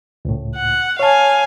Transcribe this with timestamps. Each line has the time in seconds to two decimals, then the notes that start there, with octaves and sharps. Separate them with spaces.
0.25 C#2 A2
0.56 F#5
0.99 C#5 F5 G#5 A5